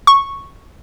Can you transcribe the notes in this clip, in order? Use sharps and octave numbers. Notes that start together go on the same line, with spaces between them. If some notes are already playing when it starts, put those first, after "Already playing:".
C#6